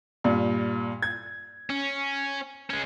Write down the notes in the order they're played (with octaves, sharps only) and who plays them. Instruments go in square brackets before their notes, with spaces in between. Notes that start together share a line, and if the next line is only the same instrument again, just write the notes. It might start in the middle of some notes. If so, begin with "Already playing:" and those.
[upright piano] G2 A#2
G#6
[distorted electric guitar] C#4
G#3 C#4